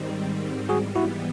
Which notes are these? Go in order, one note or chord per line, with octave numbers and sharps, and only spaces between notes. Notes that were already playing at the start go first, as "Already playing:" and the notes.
Already playing: G#2 D#3 G3 C4
G#2 E3 G3 B3 F#4 G#4
E4 F#4